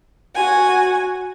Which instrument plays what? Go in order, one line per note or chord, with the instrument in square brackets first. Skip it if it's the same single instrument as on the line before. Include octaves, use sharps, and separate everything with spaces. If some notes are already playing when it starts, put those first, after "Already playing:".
[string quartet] F#4 G#5